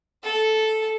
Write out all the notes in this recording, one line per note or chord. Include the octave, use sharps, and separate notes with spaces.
A4